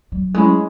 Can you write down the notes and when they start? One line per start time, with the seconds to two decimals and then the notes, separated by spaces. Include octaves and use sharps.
0.12 F#3
0.34 F#3 G#3 C#4 E4